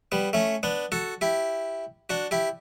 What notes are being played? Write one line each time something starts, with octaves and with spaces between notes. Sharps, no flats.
G3 B3
A3 C#4
B3 D4
F#4 A4
E4 G4
D4 F#4
E4 G4